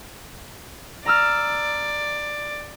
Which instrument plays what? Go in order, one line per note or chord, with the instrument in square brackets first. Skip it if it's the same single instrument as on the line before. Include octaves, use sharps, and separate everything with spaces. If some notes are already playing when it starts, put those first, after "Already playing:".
[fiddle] D5 [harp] A#5 E6 F6